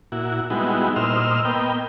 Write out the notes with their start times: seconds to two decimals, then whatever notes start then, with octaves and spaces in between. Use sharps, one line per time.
0.12 A#2 E4 F#4
0.50 G3 G#3 B3 D#4 E4 F#4
0.96 A#2 C5 D#5 E6 F6
1.45 A#3 B3 D#5 G5